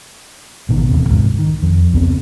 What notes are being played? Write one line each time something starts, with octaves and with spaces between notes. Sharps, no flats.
A1 B2 D#3
D#1 G#1 E2 C3
C2 G#2
D#3
F2
C#2 B3 C4